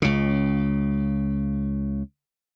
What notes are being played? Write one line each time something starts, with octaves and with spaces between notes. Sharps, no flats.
C#2 C#3